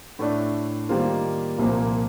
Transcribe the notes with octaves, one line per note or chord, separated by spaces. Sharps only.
A2 A3 D4
D#3 G3 A#3 F4 C5
C2 A#2 F3 A#3